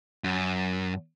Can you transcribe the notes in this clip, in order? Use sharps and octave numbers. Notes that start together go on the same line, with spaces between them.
F#2